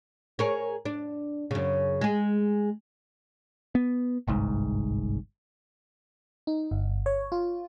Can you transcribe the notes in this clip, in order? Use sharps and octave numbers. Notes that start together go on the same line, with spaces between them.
G#4 A#4 C#5
D4
F#2 C#3
G#3 G#4
B3
G1 C2 G#2
D#4
G1
C#5
F4